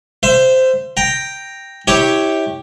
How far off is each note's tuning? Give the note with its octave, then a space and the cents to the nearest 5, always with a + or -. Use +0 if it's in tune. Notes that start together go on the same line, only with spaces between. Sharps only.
C5 -10 E5 +30
G5 +0 A#5 +0
E4 -30 G4 +0 C#5 +0